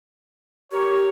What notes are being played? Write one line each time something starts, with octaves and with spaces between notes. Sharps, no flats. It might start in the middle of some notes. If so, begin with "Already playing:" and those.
G4 A#4 C#5